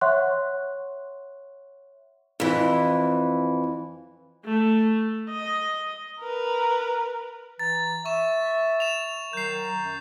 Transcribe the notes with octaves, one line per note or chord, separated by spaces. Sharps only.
C#5 E5 F#5 C6 C#6 F#6
F2 E3
A3
D#5
A#4 B4
E3 A#5 A6
E5 C#6 E7
E7 F7
D#3 F#3 A#4 G6 C7
F#2